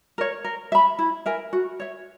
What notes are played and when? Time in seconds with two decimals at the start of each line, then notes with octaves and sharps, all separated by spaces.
0.18 A#4 C#5
0.44 A#4
0.72 E5 B5
0.99 E4
1.26 A#4 E5 G#5
1.53 F#4
1.80 C#5 E5